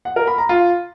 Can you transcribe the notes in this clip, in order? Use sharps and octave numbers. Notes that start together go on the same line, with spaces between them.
F#5
A#4
B5
A#5
F4